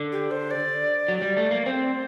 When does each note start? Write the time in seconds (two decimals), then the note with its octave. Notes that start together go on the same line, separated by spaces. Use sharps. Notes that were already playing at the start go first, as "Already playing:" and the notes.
Already playing: D3
0.12 G4
0.31 C5
0.51 D5
1.08 F#3
1.22 G3
1.37 A3
1.51 A#3
1.65 C4 C5